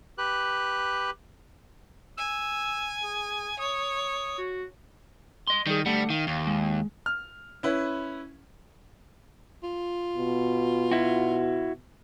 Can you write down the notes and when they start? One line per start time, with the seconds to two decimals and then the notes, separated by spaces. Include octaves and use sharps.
0.18 G4 B4 F#6
2.18 G#5 E6
3.03 G#4
3.59 C#5 D#6
4.38 F#4
5.47 D#5 C6
5.67 D#3 G3 G#4
5.86 D3 G3 A3 F#5
6.10 D#3 F5
6.27 D#2
6.47 G#3
7.06 F6
7.63 C#4 E4 B4
9.63 F4
10.17 B2
10.92 E4 F#4